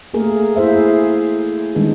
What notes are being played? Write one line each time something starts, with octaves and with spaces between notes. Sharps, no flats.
A3 A#3 G#4 A#4
E4 G#4 C5 E5 F5
D#3 G3 G#3 B3 D4 G#4